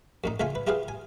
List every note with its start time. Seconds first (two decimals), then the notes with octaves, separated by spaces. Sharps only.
0.24 F#2 A2 D#4
0.40 C#2 A3 F4 E5 G#5
0.55 B4
0.67 E4 F4 G4 G#4 B4 F5
0.88 G#5